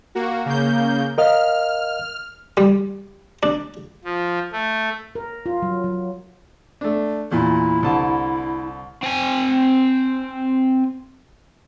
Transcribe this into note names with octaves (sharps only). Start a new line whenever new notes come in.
A#3 F#4
C#3 A#3 G6
A#4 D#5 F5 F6
G3
D4
F3
A3
A#4
F4
F#3
F#3
A3 D4
E2 A#2 E4
C2 D3 A5
C4 G#5